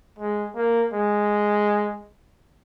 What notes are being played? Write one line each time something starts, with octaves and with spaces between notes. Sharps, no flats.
G#3
A#3
G#3